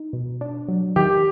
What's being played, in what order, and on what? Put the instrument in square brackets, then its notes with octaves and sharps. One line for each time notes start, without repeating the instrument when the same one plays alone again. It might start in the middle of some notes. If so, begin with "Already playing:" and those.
Already playing: [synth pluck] D#4
B2
D4
F#3
[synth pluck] D#3 [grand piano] G4